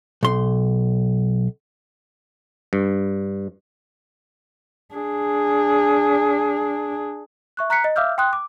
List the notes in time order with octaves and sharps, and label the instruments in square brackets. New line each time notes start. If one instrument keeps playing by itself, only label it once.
[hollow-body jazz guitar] B1 C6
[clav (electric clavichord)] G2
[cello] D4 G#4
[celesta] E5 C#6 F#6
A#5 F#6 B6 C#7
D#5
E5 F5 D6 E6 F6 G6
G5 C6 D#6 F#6
D6